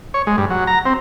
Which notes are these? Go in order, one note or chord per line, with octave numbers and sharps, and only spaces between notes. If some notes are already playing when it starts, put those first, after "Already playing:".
C#5
G#3
G2
F#3
A#5
C4